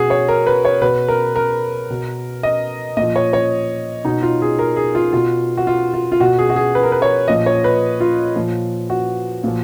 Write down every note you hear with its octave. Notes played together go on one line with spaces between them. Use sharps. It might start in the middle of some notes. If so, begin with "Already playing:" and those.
Already playing: B2 F#4 G#4
C#5
A#4
B4
C#5
B2 B4
A#4
A#4
B2
D#5
A#2 D#5
F3
C#5
C#5
B2 D#4
F4
G#4
A#4
G#4
F4
B2 F4
F#4
F4
F4
F4
B2 F#4
G#4
F#4
G#4
B4
A#4
B4
C#5
A#2 F3 D#5
C#5
B4
F4
A#2 F3
F#4
A#2 F3